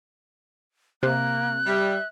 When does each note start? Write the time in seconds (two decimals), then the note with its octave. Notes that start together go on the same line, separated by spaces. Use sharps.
1.03 C3 A#3 F#6
1.66 G3 E5